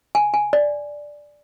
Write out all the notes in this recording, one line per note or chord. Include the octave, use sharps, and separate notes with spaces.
G#5
G#5
D5